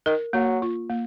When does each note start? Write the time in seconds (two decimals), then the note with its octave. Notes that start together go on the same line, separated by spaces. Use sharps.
0.06 D#3 A#4
0.33 F#3 A#3
0.62 F4
0.90 A#3